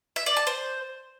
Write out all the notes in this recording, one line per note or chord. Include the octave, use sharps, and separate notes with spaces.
E5
D5
A5
C5